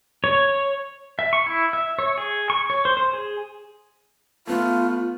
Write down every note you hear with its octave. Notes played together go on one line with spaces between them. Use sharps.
C#5
E5
C#6
E4
E5
C#5
G#4
C#6
C#5
C5
C5
G#4
A3 B3 F4